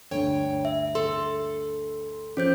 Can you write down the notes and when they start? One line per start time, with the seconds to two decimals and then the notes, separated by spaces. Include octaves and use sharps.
0.11 D2 G2 D3 C#5 G5 G#5
0.65 E5
0.95 A4 C6
2.37 F3 C#4 C5 G6